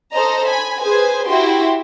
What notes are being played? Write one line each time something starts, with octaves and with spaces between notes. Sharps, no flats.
A4 C5 D#5 A#5
G#5 B5
G#4 B4 C5 G#5
E4 F#4 G4 C6